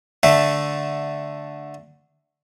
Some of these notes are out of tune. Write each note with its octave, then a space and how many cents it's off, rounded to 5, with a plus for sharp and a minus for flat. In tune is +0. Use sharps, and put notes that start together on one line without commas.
D3 +0 A3 +0 E5 +0